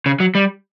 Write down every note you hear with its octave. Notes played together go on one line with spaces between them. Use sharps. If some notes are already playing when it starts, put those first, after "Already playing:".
C#3
F#3
G3